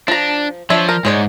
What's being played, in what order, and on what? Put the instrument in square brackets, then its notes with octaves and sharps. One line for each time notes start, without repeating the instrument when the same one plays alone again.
[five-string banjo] F3 A#5 [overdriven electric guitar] D4
[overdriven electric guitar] F3 [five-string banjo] D4 C#5 E5
[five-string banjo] A#4
[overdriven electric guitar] G#2 [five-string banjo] G#3 C#5 D5